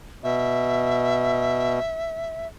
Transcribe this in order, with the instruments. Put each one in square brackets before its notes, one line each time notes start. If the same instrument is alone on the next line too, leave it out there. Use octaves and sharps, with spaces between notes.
[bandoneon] B2 [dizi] E5